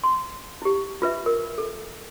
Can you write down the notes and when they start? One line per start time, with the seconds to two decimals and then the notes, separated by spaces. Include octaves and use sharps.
0.04 C6
0.62 E4 G4
1.02 F4 B4 E5
1.26 A#4
1.58 A4